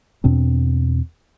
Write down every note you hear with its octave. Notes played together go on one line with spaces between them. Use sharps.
E2 B2 C4 D4